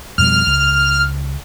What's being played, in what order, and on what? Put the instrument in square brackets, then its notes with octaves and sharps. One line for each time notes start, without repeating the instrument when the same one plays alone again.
[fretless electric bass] F2 B2 G3 [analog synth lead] F6
[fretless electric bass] C#2